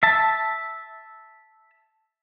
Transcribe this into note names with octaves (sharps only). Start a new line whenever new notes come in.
E5 A5